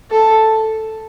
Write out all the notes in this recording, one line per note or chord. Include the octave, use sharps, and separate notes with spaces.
A4